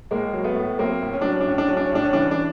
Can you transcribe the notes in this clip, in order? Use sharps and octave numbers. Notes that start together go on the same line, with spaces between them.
A2 G#3 A#3
F#3
A3 B3
A2
F#3 A#3 C4
A2
C#4
F#3 D4
C#4
D4
A2 C#4
D4
F#3 C#4
D4
C#4
A2 D4
C#4
E3 D4
C#4
D4